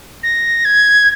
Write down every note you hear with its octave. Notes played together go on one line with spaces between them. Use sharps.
A#6
G#6